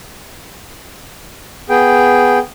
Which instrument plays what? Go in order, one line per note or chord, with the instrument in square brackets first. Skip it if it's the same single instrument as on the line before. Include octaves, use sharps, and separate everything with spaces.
[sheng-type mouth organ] B3 G#4 G5